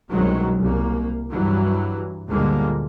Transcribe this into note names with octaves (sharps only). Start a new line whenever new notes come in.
C2 F#2 B2 D#3 F#3 G#3
C2 A#3
G2 E3 F#3 G3
D2 A#2 D3 G3 G#3 A#3